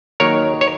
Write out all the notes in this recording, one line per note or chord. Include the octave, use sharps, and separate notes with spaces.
D#2 D#3 F#3 A#4 C#5
C#5